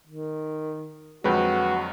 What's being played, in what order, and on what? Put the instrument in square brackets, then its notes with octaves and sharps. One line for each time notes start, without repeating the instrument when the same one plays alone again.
[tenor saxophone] D#3
[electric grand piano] F2 D3 F#3 [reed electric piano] G#3 B4 G5 [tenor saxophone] F#4